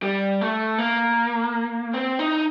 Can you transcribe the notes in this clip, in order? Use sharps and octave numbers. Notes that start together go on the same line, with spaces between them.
G3
A3
A#3
C4
D#4